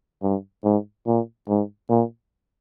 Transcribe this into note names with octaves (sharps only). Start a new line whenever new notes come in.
G2
G#2
A#2
G#2
A#2